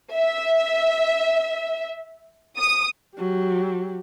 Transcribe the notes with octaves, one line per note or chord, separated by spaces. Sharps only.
E5
D#6
F#3 G4